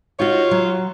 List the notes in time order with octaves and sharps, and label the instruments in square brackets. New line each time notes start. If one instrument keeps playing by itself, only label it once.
[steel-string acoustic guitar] D#4 F#4 [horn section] F4 [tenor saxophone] C#5
[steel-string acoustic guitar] F#3